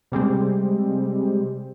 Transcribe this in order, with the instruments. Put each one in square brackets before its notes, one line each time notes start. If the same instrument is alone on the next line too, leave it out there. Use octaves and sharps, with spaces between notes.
[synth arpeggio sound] C3 G3 G#3 C4